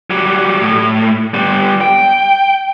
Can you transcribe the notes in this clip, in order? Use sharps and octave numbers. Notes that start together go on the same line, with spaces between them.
F#3 G3
A2
G3 B3
G5